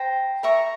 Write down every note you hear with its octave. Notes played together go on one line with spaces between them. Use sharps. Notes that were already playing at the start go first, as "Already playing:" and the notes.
Already playing: C5 G5 A#5
A#4 E5 A#5 C#6